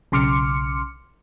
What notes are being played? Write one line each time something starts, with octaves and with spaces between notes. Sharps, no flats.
B1 C#3 C6 D6 F6 C#7